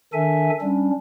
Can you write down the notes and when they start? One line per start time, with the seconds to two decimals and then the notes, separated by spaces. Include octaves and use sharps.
0.13 D#3 D4 A4 E5 G#5
0.61 G3 C#4 D4